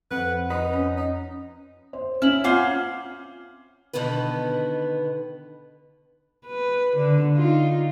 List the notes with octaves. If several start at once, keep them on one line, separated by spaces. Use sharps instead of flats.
F2 B4 F#5
D#4 B4
C#4
D#4
C5
C#4 E4 F6 F#7
C4 C#4 F4 C5 F5 F#5 D6
B2 D3 D#3 B3 B4
B4
D3
D#4 F4